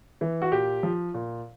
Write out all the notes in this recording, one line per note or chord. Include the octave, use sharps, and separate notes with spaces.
E3
F#4
A#2 G4
F3
A#2